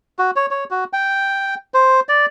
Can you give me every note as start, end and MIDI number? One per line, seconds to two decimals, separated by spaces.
0.19 0.31 66
0.36 0.46 73
0.51 0.64 73
0.71 0.84 66
0.93 1.55 79
1.74 2.00 72
2.09 2.26 74